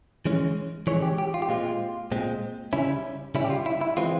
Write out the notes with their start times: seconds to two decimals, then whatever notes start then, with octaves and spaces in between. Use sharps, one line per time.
0.25 E3 G#3 C#4
0.87 E3 G#3 C#4 C#5
1.02 G4
1.18 G4
1.34 F4
1.42 G4
1.49 A#2 G#3 C4 F4
2.12 A#2 G#3 C4
2.73 C#3 G3 C#4 E4
3.35 C#3 G3 C#4 E4
3.44 G4
3.50 F4
3.66 E4
3.81 E4
3.97 E3 G#3 C4 F4